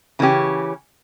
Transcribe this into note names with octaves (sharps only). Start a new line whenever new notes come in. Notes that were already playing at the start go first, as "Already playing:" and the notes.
C#3 E3 A#3 C#4 G4